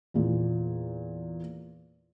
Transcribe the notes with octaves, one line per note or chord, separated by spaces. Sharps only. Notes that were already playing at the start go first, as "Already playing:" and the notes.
E2 A#2